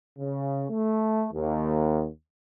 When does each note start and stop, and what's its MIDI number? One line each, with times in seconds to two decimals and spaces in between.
0.18 0.66 49
0.71 1.27 57
1.33 2.09 39